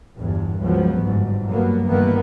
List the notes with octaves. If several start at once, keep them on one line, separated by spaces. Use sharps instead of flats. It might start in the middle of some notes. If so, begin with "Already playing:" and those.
G1 E2 G2
C#2 F3 F#3 B3
G1 G#2
G2 F#3 A#3 B3
G2 D#3 E3 A#3 B3